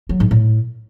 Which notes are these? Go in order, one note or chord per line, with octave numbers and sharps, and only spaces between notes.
F#3
G#2
A2